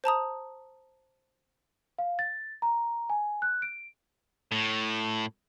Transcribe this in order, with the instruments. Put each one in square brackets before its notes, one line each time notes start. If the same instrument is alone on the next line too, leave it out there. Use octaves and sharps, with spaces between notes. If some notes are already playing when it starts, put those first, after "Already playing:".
[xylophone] C5 A5 A#5 D#6
[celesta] F5
A6
A#5
G#5
F#6
D7
[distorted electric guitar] A2